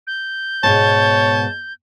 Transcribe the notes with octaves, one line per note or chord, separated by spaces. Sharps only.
G6
G#2 B2 B3 C#5 A5